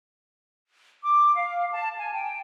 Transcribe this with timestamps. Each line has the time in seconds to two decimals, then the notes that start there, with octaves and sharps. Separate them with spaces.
1.03 D6
1.35 F5
1.74 A5
1.98 G#5
2.13 G5